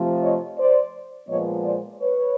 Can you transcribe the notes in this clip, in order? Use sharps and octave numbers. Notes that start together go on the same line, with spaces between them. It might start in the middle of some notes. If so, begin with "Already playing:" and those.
Already playing: C3 F3 A3
C#5 D#5
C5 D5
A#2 F3 G#3 B3 C#5 D#5
C5 D5
B4 C#5